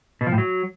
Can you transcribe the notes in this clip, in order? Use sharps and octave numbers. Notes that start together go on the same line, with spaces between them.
B2
F3
A2
F#3